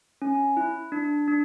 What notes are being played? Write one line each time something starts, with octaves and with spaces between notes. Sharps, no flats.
C#4
E4
D4
D4